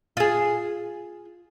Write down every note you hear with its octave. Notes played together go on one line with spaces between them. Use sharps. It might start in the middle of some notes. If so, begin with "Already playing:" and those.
F4 G#4